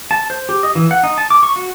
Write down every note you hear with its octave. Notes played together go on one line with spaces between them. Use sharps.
A5
C5
G4
D#5
E3
F#5
D#4
A5
D6
C#6
F#4